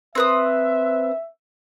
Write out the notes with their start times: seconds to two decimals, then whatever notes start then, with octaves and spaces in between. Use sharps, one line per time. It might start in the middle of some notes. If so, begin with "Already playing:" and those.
0.15 C4 B4 E5 D#6